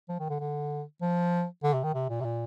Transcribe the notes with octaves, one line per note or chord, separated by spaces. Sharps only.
F3
D#3
D3
D3
F3
D3
C3
D#3
C3
A#2
C3
A#2